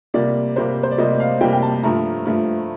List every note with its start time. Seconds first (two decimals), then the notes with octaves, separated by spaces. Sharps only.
0.14 C3 G3 A#3 D5
0.56 C3 G3 A#3 C5
0.83 C5
0.91 D5
0.98 C3 G3 A#3 D#5
1.20 F5
1.41 C3 G3 A#3 G5
1.53 G5
1.62 A5
1.83 G2 F3 A3 A#5
2.26 G2 F3 A3